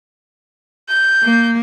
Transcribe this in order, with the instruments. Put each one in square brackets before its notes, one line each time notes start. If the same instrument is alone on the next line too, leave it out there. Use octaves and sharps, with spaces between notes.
[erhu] G6
[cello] A#3